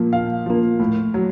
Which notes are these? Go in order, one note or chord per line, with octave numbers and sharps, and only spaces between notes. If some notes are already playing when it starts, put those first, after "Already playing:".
Already playing: A#2 F3 A#3
A#2 F5
F3 A#3
A2
F#3